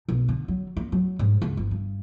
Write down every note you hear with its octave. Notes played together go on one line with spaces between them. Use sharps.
B1
D3
F#3
A#3
F#3
G#2
C#2
G1
G2